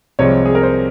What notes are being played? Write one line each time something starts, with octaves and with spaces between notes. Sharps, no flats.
C2 C3 F3 G#3 C#5
G#4
A#4
C5